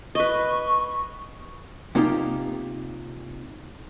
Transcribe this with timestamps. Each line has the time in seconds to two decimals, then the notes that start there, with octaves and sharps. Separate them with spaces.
0.15 B4 D#5 C#6
1.95 C3 A#3 D#4 F4 G4